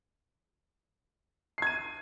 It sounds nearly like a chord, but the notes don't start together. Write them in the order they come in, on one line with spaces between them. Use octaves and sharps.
C7 G#6 D#7